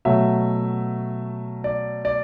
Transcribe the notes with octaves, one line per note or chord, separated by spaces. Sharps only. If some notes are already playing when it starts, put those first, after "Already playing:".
B2 F#3 A3 E5
D5
D5